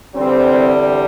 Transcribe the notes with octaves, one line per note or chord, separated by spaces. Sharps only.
E2 D3 G3 C4